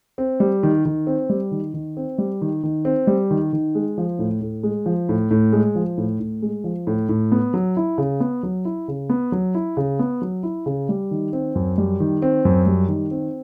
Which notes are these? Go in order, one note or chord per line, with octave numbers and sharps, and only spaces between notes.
C4
G3
D#3
D#3
C4
G3
D#3
D#3
C4
G3
D#3
D#3
C4
G3
D#3
D#3
G#3
F3
A2
A2
G#3
F3
A2
A2
G#3
F3
A2
A2
G#3
F3
A2
A2
B3
F#3
E4
C#3
B3
F#3
E4
C#3
B3
F#3
E4
C#3
B3
F#3
E4
C#3
G3
D#3
C4
F#2
G3
D#3
C4
F#2
G3
D#3
C4